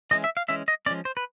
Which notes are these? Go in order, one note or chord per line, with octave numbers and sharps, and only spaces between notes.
E3 G#3 C#4 D#5
E5
F5
E3 G#3 C#4 E5
D#5
F3 G#3 C#4 D5
C5
B4